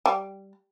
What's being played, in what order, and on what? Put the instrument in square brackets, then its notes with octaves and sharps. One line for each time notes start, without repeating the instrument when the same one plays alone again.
[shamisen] G3